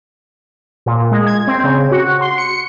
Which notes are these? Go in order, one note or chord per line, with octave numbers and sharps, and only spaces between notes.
A#2
G#3
G#6
C4
C#3
F#4
C6
C#7